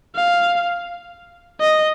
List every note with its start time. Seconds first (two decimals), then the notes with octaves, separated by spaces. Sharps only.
0.16 F5
1.61 D#5